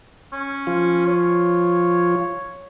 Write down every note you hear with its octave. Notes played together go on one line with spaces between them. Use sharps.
C#4
F3 F4
C#5